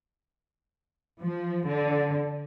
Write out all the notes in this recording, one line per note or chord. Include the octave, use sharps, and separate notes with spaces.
F3
D3